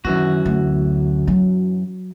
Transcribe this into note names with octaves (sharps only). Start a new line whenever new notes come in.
F#2 D#3 E3 F#4
D2
F#3